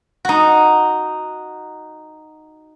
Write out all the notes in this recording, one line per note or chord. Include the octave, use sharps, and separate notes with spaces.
D#4 F#4